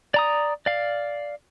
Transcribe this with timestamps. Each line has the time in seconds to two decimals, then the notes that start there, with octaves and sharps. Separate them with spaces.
0.14 D5 A#5 D#6
0.66 D5 F5